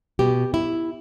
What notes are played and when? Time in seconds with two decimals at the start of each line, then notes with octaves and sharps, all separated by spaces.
0.19 B2 G4
0.54 E4